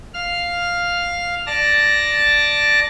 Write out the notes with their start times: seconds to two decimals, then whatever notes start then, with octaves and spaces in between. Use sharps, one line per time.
0.14 F5 F6
1.47 D5 A5 A#6